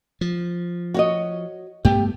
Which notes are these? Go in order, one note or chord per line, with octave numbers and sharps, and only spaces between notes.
F3
F#4 C#5 D#5
G2 A3 B3 G4